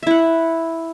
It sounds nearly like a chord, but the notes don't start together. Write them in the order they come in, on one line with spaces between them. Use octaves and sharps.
E5 E4 F#5